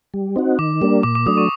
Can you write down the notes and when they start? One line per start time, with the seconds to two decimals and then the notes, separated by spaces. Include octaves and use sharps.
0.14 G3
0.36 C4 D#4 F#4
0.59 D#3 D6
0.82 G3 A#3 D4
1.03 A#2 D6
1.15 D6
1.26 F#3 A3 D4 D#6
1.37 C#6